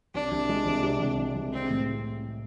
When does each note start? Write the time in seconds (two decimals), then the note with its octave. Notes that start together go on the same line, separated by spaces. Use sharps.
0.14 C2 D4
0.32 C2
0.49 G#3
0.66 C2
0.83 C3
1.00 C2
1.18 G#3
1.36 C2
1.53 C4 G#4
1.70 A2